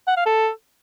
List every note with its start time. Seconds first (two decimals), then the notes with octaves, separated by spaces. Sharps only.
0.08 F#5
0.17 F5
0.26 A4